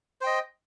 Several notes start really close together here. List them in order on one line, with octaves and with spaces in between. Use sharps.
C5 G5 D#5